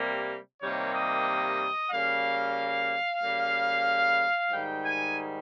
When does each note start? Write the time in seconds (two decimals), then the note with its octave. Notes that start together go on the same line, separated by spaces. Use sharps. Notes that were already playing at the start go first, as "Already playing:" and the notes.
Already playing: C3 G3 A#3
0.62 C3 D#3 G3 A#3 C#5
0.94 D#5
1.91 C#3 G3 A#3 F5
3.21 C#3 G3 A#3
4.51 G#2 D#3 G3 G5
4.84 G#5